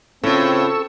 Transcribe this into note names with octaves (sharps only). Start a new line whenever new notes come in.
A2 C#3 C4 C#4 F4 A4 C#6 E6